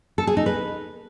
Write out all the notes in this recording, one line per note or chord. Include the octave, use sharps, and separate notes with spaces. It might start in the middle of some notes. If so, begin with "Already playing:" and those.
A4
G#4
D#4
B4